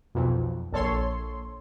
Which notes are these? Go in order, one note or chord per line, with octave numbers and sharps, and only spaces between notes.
B1 F2
A#1 A4 C#5 C6